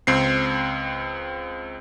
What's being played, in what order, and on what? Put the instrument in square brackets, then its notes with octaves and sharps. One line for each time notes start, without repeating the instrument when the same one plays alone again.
[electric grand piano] C#2 C4 C7